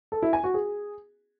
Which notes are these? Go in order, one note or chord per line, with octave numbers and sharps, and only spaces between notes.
A4
E4
G#5
F#4
G#4